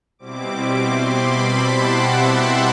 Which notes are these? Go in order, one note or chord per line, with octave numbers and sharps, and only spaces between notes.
B2 G3 C4 E4 D6
D6
C6
B5
A5
F#5
E5